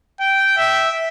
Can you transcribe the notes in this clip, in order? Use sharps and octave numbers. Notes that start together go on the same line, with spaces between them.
G5
E5